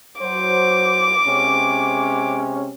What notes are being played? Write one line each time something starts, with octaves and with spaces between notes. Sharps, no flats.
F#3 C5 D6
C3 G#3 C#4